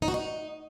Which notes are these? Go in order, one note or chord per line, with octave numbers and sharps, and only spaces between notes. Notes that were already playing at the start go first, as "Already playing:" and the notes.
D#4
F#4
D#4